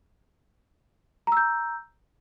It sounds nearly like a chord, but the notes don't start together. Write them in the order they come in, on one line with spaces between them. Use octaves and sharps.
A#5 E6 G6